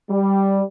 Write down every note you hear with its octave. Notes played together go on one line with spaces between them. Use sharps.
G3